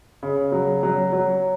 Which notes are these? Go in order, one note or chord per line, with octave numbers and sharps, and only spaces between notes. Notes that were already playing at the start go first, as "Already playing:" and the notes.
C#3
F#3
F#3
F#3